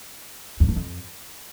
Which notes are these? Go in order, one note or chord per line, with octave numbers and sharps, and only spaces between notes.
F2
E2
F2